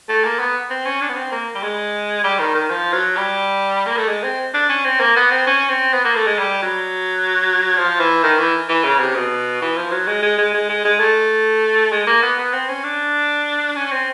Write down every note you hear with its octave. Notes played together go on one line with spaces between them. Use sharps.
A3
A#3
B3
C4
C#4
D4
B3
C4
A#3
G3
G#3
G3
D#3
D#3
F3
F#3
G3
A#3
A3
G#3
C4
D4
C#4
C4
A#3
B3
C4
C#4
C4
B3
A#3
A3
G#3
G3
F#3
F3
E3
D#3
E3
E3
C#3
C3
B2
E3
F3
F#3
G#3
G#3
G#3
G#3
G#3
G#3
A3
G#3
A#3
B3
B3
C4
C#4
D4
C#4
C4